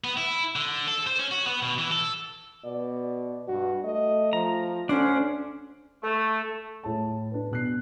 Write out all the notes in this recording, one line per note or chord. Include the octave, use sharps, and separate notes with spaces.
B3
E4
D3
A4
C5
C#4
F#4
B3
B2
E3
A4
B2 D5
G2 F#4
A3 D#5
F3 A#5
D2 D3 C#4 D4 C5
A3
A2 G#4 A5
D4 B4
B2 F#6 C7